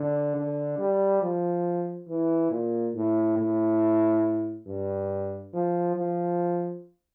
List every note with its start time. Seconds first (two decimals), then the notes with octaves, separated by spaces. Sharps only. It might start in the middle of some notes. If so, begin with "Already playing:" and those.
Already playing: D3
0.36 D3
0.78 G3
1.22 F3
2.08 E3
2.51 A#2
2.95 A2
3.37 A2
4.67 G2
5.53 F3
5.96 F3